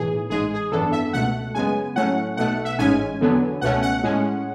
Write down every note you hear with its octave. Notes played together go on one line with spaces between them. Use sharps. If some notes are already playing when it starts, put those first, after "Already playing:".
Already playing: B1 A2 E3 G#4
A1 G#2 G#3 G#4
G#4
G#1 F#2 E3 B3 D4 A4
E5
C#2 B2 A3 F#5
F#2 C#3 G#3 B3 G#5
A2 F#3 A3 C#4 F#5
B1 B2 A3 F#5
E5
A1 G#2 G#3 C#4 G#5
E2 D3 F#3 B3
C#2 B2 A3 C#4 F#5
F#5
A2 G#3 C#4